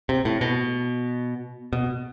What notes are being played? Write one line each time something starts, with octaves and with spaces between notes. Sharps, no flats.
C3
A2
B2
B2